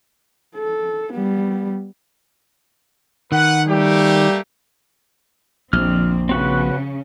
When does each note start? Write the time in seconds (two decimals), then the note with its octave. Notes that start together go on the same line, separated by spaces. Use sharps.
0.56 A4
1.13 G3 B3
3.32 D#3 B4 F#5
3.68 G3 A3 A#3 G4
5.73 A#1 F2 D3 C4 F6
6.29 C#3 C4 C#4 F#4 B4